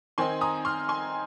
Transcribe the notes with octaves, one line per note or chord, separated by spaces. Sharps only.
D#3 C4 D#4 G#5 C6
A#5 D#6
C6 F6
G#5 C6